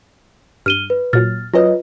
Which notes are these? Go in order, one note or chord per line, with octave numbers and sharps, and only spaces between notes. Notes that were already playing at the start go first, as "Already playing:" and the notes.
G2 F6 D#7 G7
B4
A#2 F#3 F6 A6
F#3 C#4 F4 B4 D#5